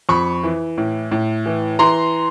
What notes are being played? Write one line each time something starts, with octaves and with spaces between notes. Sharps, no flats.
F2 B5 C#6
E3
A2
A2
E3
E3 A#5 C6